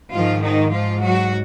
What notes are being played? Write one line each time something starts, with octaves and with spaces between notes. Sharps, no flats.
G#2 D#3 F3 F4
D#3 D#4
F3 F4
F#3 F#4